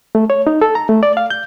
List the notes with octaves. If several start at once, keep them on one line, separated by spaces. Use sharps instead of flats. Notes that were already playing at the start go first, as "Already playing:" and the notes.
A3
C#5
D#4
A4
A#5
A3
D5
F5
G6